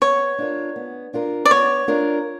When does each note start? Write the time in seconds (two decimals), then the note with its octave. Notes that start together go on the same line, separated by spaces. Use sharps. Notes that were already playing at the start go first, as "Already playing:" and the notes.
0.02 B3 C#5
0.38 D4 F4 A#4
0.76 B3
1.13 D4 F4 A#4
1.45 D5
1.51 B3 C#5
1.88 D4 F4 A#4